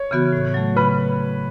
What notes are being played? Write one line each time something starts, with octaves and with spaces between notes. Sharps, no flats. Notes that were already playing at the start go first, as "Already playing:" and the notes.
Already playing: C#5
C#3 E3 B3 F#4
A2
F#3 A3
C#3 B4 B5